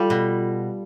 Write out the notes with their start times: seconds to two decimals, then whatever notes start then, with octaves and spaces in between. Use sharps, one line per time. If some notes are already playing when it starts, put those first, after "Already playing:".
Already playing: G3 F4 A4
0.10 B2